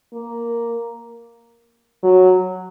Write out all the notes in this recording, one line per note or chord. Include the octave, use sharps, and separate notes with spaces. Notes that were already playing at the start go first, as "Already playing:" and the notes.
A#3
F#3